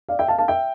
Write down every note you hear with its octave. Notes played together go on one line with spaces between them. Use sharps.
D5 F5
E5 G5
F5 A5
F5 A5
E5 G5